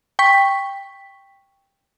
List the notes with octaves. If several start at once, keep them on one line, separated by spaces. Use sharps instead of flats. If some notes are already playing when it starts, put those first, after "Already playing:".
G5 C#6 B6